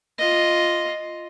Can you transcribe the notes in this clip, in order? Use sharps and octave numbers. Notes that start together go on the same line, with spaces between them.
F4 D#5